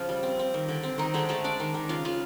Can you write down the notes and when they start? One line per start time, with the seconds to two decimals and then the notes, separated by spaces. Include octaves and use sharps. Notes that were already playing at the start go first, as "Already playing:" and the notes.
Already playing: C#3 F3 F4
0.09 G3
0.23 C4
0.39 C4
0.54 D#3
0.69 D3
0.83 C4
0.98 D#3 C4 D#4
1.14 D3 G#3 G#4
1.29 G#3 A3 A4
1.44 G#3 D4 D5
1.60 D#3
1.74 D#3
1.89 C#3 F4 F5
2.05 G#3 F4 F5